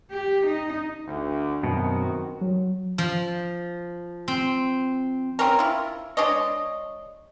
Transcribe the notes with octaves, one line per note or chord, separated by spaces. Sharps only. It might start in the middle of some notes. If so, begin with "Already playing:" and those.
G4
D#4
D2
F#2 B2 D#3 C4 F#4
F#3
F3
C4
C4 C#4 A#4
E4 F4
G#3 D4 C#5 D#5